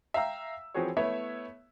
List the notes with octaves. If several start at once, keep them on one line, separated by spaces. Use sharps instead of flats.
E5 F5 G5 A#5 E6
E3 F3 C4 F#4 G#4 C#5
A3 B3 E4 C#5 E5